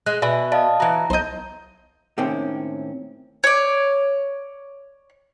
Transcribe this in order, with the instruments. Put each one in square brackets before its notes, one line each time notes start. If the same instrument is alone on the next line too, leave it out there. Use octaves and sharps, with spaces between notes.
[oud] G#3 [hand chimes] F#6
[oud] B2 [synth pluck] D5 G#5 B5 [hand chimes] E5
[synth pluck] D5 [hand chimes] D#5 F5 A5
[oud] E3 F#4 [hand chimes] A#5
[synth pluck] B1 G6 [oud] C5 D#5
[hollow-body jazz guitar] A2 C3 D#3 A#3 C4 C#4
[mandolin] C#5 D5